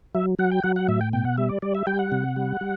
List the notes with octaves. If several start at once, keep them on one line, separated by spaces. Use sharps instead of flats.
F#3 E5
F#3 F#5
G5
F#3 F#5
F#5
A2 E5
G5
B2 G5
F#5
G3 E5
D5
G3 D5
E5
G3 G5
F#5
C3
G3
G3